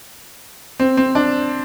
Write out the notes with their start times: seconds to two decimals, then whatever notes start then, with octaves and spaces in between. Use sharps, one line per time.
0.80 C4
0.97 C4
1.15 D4